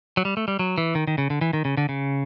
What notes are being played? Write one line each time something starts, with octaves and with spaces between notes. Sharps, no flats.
F#3
G3
A3
G3
F#3
E3
D#3
D#3
C#3
D3
E3
D#3
C#3
D3
C#3